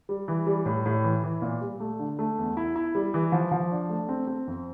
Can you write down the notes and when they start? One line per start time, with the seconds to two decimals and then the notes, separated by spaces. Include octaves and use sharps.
0.09 G3
0.28 E3
0.47 G3
0.66 A2
0.86 A2
1.04 E3
1.23 E3
1.42 A#2
1.61 G3
1.80 A3
1.99 D3
2.19 A3
2.38 E2
2.57 E4
2.76 E4
2.95 G3
3.14 E3
3.32 F3
3.52 F3
3.71 D4
3.89 A3
4.09 C4
4.27 C4
4.47 F2